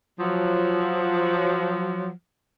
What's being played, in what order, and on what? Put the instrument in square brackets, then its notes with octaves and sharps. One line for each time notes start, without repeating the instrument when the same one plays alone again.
[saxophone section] F3 F#3